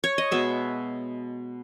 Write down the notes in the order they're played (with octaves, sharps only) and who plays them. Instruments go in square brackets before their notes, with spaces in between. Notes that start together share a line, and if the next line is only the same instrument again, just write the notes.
[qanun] C#5
D#5
B2 G#3 B3 E5